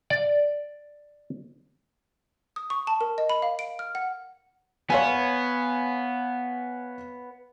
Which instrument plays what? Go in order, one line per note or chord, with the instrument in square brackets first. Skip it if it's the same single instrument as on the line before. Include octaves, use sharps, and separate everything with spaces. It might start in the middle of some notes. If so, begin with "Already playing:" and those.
[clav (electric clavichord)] D5
[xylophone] D#6
C#6
A5
A#4
D#5
B5
F5
D7
F6
F#5
[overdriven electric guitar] B3 [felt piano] C#5 F5 G#5